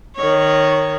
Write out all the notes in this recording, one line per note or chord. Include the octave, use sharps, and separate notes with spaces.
D#3 C#5